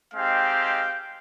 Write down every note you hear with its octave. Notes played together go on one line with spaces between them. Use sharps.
G#3 C4 D#4 G4 F5 G5